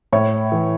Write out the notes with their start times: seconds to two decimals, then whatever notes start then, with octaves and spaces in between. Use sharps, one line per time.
0.13 A2 C#5
0.52 E3